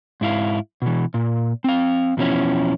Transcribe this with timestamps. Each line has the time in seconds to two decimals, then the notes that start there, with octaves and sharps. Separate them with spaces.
0.21 G#2 E4 F5
0.82 B2 E3
1.14 A#2
1.64 C4 F5
2.17 E2 B2 F3 C#4 E4